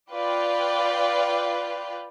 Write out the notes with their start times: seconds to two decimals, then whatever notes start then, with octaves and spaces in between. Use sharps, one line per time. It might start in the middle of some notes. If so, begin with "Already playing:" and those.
0.12 F4 B4 D5 G5